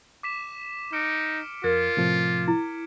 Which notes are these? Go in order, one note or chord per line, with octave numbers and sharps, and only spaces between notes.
D6 B6 E7
D#4 F6 C#7 D7
F2 F4 A#4 G#6
A2 C3 F3
E4